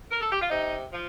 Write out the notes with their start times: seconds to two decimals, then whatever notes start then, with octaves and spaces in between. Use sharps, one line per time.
0.11 A#4
0.21 A4
0.31 G4
0.41 F4
0.49 C3 D#4
0.92 F3